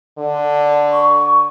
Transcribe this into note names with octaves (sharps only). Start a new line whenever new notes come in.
D3
C#6